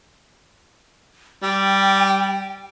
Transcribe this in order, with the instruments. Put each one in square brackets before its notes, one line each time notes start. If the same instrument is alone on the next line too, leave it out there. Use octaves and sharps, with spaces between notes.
[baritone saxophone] G3 [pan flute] G5